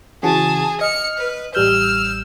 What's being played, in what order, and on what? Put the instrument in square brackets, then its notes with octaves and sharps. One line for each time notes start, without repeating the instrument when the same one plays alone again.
[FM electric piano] C#3 E3 F#4 [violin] G#4 [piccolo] A5
[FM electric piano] D#5 [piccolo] F6 [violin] C#7
[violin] B4
[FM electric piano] A1 G3 G6 [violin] E6 [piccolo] F6